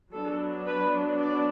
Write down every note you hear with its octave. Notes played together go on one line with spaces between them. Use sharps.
F#3 B3 D4 A4
B4
D5